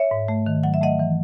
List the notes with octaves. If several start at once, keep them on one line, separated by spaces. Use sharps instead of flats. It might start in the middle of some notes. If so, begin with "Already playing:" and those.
Already playing: C#5 E5
G#2
A3
D#3
F#3 F#5
E5
A3 D#5 F#5
E3